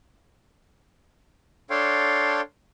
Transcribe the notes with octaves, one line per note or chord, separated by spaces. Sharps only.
D4 A4 C#5 F5 G5 C6